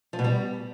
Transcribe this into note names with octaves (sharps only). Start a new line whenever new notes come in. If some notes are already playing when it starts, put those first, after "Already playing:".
F3
B2
G3